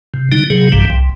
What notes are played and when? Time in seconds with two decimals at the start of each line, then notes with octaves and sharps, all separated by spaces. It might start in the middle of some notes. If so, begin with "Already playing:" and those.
0.14 C3
0.32 D3 G3 D#4
0.50 C3 F#3 G#4
0.72 A#1 G2 E3 G3
0.90 C2